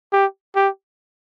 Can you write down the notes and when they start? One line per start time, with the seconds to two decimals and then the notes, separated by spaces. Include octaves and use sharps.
0.13 G4
0.56 G4